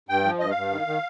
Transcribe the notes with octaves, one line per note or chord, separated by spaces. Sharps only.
G2 G5
F3
G2 D#5
F5
G2
D#3
D#3